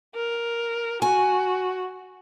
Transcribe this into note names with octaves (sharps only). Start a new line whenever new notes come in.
A#4
F#4 G#5